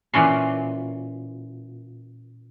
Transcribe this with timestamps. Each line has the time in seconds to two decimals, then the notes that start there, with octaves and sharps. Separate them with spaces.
0.14 A#2 E3 C#4 C6